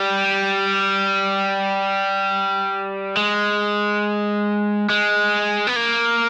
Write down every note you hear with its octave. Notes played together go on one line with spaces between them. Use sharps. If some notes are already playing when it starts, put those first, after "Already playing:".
Already playing: G3
G#3
G#3
B3
A#3